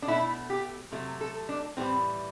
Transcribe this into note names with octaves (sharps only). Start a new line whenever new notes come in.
D4
B2 A3 E4
G4
C3 F#3 A3
A4
D4
A2 E3 G3 C4